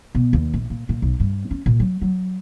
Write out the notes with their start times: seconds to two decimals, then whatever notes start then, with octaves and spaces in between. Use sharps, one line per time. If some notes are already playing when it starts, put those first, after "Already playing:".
0.15 B2
0.33 D#2
0.54 A#1
0.70 A#2
0.89 A#2
1.02 B1
1.20 G2
1.51 C#4
1.66 A#2
1.80 F#3
2.02 F#3